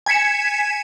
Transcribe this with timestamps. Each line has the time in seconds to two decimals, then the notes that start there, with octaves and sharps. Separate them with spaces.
0.06 G#5 G#6 B6 C#7 E7